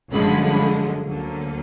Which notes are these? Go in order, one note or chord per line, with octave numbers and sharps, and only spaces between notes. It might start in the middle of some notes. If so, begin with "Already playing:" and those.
G1 F#2 D3 F3 G#3 B5
D2 D3 F#3 A#3